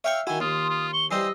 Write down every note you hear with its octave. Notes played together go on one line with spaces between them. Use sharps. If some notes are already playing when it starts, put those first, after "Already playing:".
C#5 E5 F5 G5 C#6
D#3 E4 F#4 G#5
D#2 F4 C6 D#6
F4
C#6 G7
E3 G3 C5 D#5 E6 C7